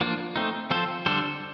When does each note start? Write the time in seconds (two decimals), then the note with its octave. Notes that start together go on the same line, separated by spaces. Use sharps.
0.01 F3 A#3 D4 F4
0.36 A3 C4 D#4
0.71 F3 C4 F4 A4 C5
1.06 D3 G3 D4 A4 C5